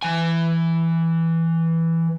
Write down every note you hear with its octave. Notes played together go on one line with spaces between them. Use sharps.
E3 G#5